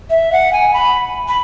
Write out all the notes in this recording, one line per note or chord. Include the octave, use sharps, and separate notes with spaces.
E5
F#5
G#5
B5
B5